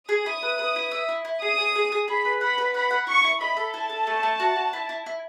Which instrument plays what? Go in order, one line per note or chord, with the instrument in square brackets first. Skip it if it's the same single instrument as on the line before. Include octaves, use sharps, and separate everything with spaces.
[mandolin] G#4 [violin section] D#6
[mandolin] E4
B4
B4
E4
E5
E4
E4
[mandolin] G#4 [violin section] D#6
[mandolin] G#4
G#4
G#4
[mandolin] G#4 [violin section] B5
[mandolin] B4
[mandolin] F#5 [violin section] B5
[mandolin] B4
[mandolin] F#5 [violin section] B5
[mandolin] F#5
[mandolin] E4 [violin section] C#6
[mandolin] E4
[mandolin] D#5 [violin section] B5
[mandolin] A4
[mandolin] E4 [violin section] A5
[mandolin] A4
A3
A3
F#4
F#4
E4
E4
E4